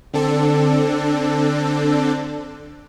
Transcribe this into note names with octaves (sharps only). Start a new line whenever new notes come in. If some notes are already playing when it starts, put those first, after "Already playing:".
D3 C4 D4 A4